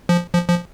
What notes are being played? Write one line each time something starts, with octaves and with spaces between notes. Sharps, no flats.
F3
F3
F3